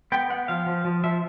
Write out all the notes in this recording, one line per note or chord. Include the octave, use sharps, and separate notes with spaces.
B3 G5
B3 F#5
F3 F5
F3
F3
F3 E5